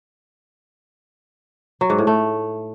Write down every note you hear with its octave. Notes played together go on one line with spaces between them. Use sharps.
F#3
G#2
A2
A3